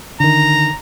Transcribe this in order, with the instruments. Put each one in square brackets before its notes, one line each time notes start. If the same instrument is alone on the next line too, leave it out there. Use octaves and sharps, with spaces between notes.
[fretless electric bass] D3 D#3 [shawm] A#5